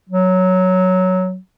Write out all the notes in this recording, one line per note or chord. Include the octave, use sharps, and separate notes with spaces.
F#3